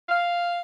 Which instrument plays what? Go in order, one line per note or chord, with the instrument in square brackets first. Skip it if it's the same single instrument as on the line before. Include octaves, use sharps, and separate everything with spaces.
[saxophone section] F5